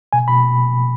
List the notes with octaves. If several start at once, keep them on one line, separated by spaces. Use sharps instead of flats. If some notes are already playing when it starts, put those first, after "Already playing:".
B2 G#5
B2 B5